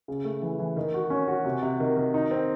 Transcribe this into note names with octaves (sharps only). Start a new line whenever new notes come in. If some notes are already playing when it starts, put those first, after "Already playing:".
C#3
A3
E3
E3
D#3
F#4
C#4
F#4
C3
C3
D#3
D#3
D#4
C4